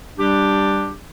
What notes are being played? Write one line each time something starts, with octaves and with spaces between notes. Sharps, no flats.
G3 D4 G4